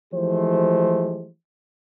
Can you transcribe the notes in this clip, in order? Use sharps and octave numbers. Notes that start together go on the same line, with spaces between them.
E3 F3 G#3 A3 G4 C5